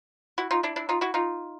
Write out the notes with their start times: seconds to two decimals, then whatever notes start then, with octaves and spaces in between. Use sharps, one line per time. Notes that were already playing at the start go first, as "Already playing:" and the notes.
0.38 E4 F#4
0.51 D#4 F4
0.63 D4 E4
0.76 D4 E4
0.89 D#4 F4
1.01 E4 F#4
1.14 D#4 F4